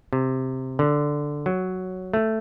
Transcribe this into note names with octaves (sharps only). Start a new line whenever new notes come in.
C3
D3
F#3
A3